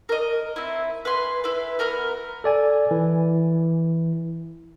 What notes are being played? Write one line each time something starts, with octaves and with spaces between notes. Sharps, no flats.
A#4 D#5
C4 E4
B4 G#5 C6
E4 B4
B3 A#4 B5 F6
A4 D5 G#5
E3